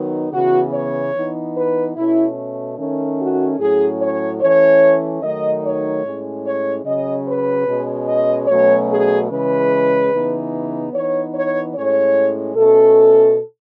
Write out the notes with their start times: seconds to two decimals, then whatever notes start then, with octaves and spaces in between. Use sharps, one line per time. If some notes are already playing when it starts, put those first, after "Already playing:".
Already playing: D#3 F#3 B3 D#4
0.33 C#3 E3 B3 F#4
0.73 C#5
1.14 E3 B3 D#4
1.56 B4
1.96 B2 A3 C#4 E4
2.78 D#3 A3 C#4
3.19 F#4
3.59 A2 F#3 C#4 G#4
4.00 C#5
4.41 E3 A3 C#4 C#5
5.22 D#3 F#3 A3 D#4 D#5
5.63 C#5
6.04 A2 G#3 C#4
6.45 C#5
6.85 C#3 F#3 C#4 D#5
7.25 B4
7.66 B2 G#3 C#4
8.07 D#5
8.48 B2 F#3 A3 C#4 C#5
8.89 G#4
9.29 C#3 E3 G#3 C#4 B4
10.11 C#3 E3 B3 D#4
10.92 E3 B3 D#4 C#5
11.34 C#5
11.74 A2 G#3 C#4 C#5
12.56 B2 A3 C#4 A4